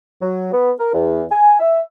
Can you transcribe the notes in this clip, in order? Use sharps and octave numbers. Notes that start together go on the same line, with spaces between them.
F#3
B3
A#4
E2
G#5
E5